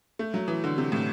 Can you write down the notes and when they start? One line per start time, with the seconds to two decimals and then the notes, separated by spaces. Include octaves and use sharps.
0.19 A3
0.34 F#3
0.48 E3
0.64 D3
0.78 C3
0.92 A2